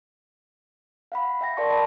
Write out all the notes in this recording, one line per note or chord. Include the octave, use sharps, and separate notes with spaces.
F5 F#5 B5
E5 G5 A#6
A#4 D5 F5 A5 C6 C#6
D#5 G5 A5 B5